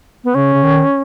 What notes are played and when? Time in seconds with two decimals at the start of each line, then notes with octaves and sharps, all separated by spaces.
0.24 B3
0.35 C#3 C#4
0.53 C#3
0.63 D#3